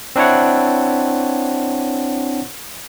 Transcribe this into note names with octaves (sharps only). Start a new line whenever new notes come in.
C4 D4 E4 C#5 F#5